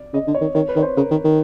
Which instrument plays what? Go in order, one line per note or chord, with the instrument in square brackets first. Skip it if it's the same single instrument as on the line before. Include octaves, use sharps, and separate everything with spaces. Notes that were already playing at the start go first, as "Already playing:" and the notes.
Already playing: [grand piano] D5
[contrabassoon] C#3 [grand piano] D#5
[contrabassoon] D3
[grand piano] C#5
[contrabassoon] D#3
[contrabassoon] D#3 [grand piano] C#5
[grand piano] B4
[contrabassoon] D#3 [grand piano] C#5
[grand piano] C5
[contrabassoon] C#3 [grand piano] A#4
[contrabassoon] D#3
D#3